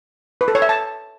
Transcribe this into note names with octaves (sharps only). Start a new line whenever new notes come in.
B4
A4
C#5
E5
A5